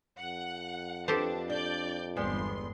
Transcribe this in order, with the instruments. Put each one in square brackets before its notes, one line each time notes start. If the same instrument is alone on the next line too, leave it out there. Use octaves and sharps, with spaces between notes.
[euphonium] F2 [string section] F#5
[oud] B3 [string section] D4 [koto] G4 A4 C5
[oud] D4 [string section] D5 G6
[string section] G1 E2 C6 [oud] G3 G#3 B3